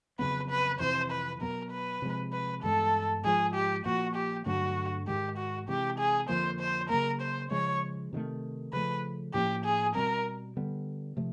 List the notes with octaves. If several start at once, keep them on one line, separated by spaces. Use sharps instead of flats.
F2 C#3 F#3 B3 B4
B4
F2 C3 E3 C5
B4
B2 F#3 B3 A#4
B4
C3 F3 G#3
B4
G2 E3 G#3 B3 A4
G#2 F3 G#3 G#4
G4
A#2 F3 A#3 F#4
G4
G2 D3 F#3 A3 F#4
G#2 D#3 G#3 G4
F#4
C3 E3 G#3 G4
G#4
F2 D3 F3 A#3 C5
C5
C#3 F#3 A#3 A#4
C5
C#3 F3 G#3 C#5
C3 D#3 F#3 A3
C#3 F3 A3 B4
A2 F3 A#3 C#4 G4
G#4
B2 G3 C4 A#4
D3 G3 B3
C3 F3 A3